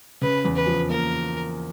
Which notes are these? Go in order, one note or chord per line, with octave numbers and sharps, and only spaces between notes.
C#3 B4
E2
B4
F3
A#3 A#4